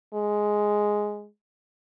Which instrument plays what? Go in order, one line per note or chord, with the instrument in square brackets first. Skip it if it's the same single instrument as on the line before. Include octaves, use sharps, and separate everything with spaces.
[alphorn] G#3